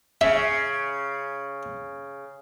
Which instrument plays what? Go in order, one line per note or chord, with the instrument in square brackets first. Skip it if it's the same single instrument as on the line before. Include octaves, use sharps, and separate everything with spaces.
[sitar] C#3 [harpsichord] E5